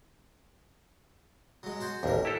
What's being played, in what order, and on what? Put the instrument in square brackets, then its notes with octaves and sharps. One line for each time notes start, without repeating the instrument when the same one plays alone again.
[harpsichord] F#3 G#3
F#4 C5 G#5
[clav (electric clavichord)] A1 D#2 [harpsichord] D4 A#4
[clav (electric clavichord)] E4 G4 A4